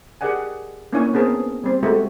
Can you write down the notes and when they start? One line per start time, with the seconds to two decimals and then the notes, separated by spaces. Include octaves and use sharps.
0.21 G4 G#4 A#4 D5 F#5 G#5
0.93 A#3 C#4 D4 E4 C#5 G#5
1.13 B3 C4 G#4 A#4 A5
1.64 G3 C4
1.83 G#3 A3 F#4 G4 A4 E5